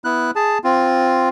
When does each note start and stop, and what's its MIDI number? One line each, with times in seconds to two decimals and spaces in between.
0.05 0.31 59
0.05 0.31 64
0.05 0.31 90
0.35 0.58 68
0.35 0.58 81
0.64 1.29 60
0.64 1.29 65